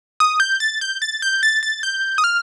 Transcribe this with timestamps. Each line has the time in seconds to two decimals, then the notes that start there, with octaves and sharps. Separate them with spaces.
0.20 D#6
0.40 G6
0.60 A6
0.81 G6
1.02 A6
1.22 G6
1.43 A6
1.63 A6
1.83 G6
2.18 D#6
2.24 F6